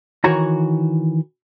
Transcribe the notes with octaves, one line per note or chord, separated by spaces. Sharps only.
D#3 E3 F#4 C#5 A#5